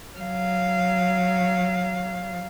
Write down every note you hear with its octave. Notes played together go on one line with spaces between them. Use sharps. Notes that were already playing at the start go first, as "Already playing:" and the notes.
F#3 F5